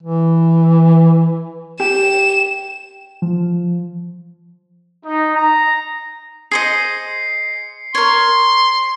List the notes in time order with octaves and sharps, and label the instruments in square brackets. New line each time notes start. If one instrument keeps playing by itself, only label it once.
[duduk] E3
[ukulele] G4 [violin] E7
[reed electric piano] F3
[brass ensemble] D#4
A#5
[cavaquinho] G#4 C5 D#5 [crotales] C7 C#7
[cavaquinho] A#4 C#5 [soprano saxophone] C6